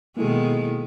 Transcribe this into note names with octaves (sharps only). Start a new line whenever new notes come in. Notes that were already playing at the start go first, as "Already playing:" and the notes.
B2 D#3 G#3 A#3 E4 A4